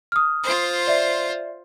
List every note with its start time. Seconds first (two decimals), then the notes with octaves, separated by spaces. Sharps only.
0.12 D#6 F6
0.44 F4 C5
0.87 D5 E5